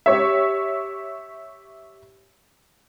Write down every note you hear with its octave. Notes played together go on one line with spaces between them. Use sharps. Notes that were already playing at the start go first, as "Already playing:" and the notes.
G4 C#5 E5